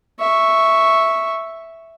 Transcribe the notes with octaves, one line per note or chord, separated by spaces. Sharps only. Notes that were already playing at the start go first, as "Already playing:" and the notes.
E5 C#6